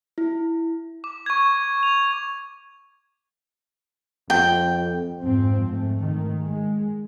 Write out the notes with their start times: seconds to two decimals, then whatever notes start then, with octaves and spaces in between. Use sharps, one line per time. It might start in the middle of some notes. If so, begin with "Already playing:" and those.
0.18 E4
1.04 D6
1.26 C#6 G#6
1.83 F7
4.30 F2 G5
5.20 F2 G#2 F3 C4
5.65 G#2 A3
5.99 D#3
6.42 G#3